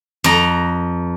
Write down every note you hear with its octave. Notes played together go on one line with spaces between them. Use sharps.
F2 A#5